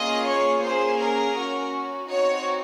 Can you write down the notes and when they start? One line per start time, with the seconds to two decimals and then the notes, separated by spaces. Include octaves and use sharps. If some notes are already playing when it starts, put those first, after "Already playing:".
Already playing: A#3 C#4 F4 G#4 D#5
0.28 C#5
0.64 A#3 C#4 G#4 C5
1.00 A#4
1.36 C#4 F#4
2.08 C4 D#4 F#4 C#5